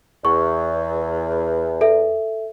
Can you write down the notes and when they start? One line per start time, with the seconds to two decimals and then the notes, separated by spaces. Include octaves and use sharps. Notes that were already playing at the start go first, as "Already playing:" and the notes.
0.25 E2 C#6
1.81 A4 E5